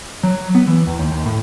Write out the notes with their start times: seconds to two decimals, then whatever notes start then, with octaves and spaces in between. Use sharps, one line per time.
0.23 F#3
0.55 B3
0.67 E3
0.87 E2
0.99 D#2
1.12 D#2
1.26 A2